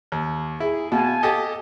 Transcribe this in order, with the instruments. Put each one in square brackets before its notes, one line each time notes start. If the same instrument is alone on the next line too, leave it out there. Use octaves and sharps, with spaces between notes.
[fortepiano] D#2
[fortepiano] E4 [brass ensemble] G#4
[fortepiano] B2 [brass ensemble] F5 G#5 A5
[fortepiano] G4 A4 D#5